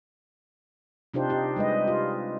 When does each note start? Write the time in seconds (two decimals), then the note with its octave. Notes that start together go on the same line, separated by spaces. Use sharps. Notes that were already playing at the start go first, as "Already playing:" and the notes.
1.14 C3 D4 D#4 F4 G4 C5
1.30 D#4 G4
1.56 G3 G#3 B4 D#5
1.88 F4